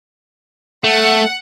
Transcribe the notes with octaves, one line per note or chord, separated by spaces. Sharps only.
A3 F#5